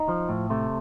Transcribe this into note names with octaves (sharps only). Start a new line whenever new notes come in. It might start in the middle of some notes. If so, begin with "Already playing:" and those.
Already playing: D#4
F3
A2
C3 A3